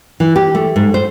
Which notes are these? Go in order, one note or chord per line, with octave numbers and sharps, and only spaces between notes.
E3
G4
A3
G#2
C5